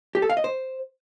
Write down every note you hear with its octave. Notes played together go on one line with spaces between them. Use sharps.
G4
A4
F5
D#5
C5